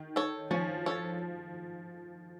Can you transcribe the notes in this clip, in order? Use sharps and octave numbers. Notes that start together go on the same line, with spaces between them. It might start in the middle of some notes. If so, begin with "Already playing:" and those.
Already playing: D#3
A4 C#5
F3 C#4
A4 C#5